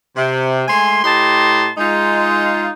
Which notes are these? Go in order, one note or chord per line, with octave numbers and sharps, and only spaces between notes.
C3
G#3 A3 G#5 C6
A2 G4 D#5 A5 A#5 C6
G#3 D#4 F4